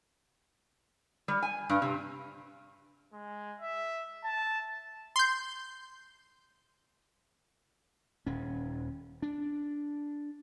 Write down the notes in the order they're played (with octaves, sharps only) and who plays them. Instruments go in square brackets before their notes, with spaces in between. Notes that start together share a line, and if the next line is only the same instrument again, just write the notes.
[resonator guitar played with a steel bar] G3
G#5
G2
C3
[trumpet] G#3
E5
A5
[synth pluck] C6 G6
[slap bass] D#1 C#4
D4